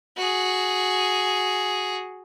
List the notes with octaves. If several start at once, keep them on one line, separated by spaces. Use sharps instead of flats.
F#4 G#4